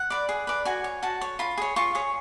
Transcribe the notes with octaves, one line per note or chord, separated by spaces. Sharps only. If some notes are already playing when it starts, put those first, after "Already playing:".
Already playing: F#5
B4 D5
G#4
B4 D5
F#4 G#5
C#5
F#4 A5
C#5
F4 B5
G#4 C#5
F4 C#6
G#4 C#5